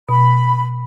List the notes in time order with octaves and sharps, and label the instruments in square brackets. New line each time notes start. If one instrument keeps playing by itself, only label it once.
[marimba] B2 [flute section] B5